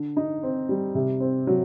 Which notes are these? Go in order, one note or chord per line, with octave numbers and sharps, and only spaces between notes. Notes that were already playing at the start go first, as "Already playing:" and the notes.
Already playing: D3
D#4
C4
G3
C3
C4
F#3